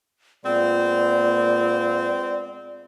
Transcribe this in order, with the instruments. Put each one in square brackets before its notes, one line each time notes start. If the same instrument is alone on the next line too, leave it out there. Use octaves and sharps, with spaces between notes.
[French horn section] A#2 F4 [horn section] G#3 B3 C4 [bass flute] D5